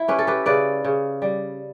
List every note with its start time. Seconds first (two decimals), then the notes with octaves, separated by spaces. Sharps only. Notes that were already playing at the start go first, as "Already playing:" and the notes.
Already playing: E4
0.08 C#4 G4 B4
0.19 A4
0.27 G4 B4
0.46 C#3 B4 D5
0.85 C#3
1.22 G3